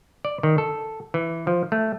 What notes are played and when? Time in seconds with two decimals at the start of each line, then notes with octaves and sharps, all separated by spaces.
0.25 D5
0.43 D#3
0.58 A4
1.14 E3
1.47 F3
1.72 A3